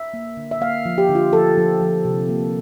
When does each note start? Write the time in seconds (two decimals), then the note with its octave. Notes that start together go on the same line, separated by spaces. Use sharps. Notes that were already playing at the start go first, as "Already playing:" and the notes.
Already playing: E5
0.14 A#3
0.37 D3
0.51 E5
0.61 A#3 F5
0.86 F3
0.98 G4
1.09 D3
1.15 F4
1.33 F3 A4
1.57 F3
1.81 F3
2.05 C3
2.29 A#3